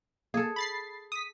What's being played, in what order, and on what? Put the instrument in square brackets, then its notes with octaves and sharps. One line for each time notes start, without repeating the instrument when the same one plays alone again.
[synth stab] A#3 [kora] G#4 A4
[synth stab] B5 A6 C7
D#6 B6